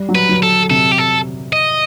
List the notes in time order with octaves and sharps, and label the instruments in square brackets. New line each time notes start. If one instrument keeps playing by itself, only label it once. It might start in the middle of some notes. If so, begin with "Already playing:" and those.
Already playing: [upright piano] G3
F#3
[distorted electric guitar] B4
[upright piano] F#3
[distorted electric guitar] A4
[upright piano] C3 [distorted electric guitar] A4
[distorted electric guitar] G4
A4
D#5